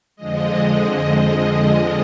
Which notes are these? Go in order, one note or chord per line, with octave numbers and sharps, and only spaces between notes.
F2 D3 F3 G#3 D#5